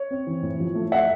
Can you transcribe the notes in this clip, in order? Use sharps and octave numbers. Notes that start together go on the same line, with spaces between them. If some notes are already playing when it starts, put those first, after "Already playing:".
Already playing: C#5
C4
E3
A2
F3
A3
A3 E5 F#5